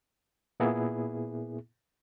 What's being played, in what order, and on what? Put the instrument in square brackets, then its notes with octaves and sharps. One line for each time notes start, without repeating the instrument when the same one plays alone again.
[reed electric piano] A#2 A#3 B3 E4 G#4